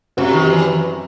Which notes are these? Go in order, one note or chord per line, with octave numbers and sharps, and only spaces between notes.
F#2 C3 F#3 C4 F#4
D#3
E3